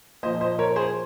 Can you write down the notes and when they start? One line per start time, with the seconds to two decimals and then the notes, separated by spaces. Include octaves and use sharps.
0.23 A#2 F3 C5 D#5
0.41 C5 D#5
0.59 A#4 C#5
0.76 G#4 C5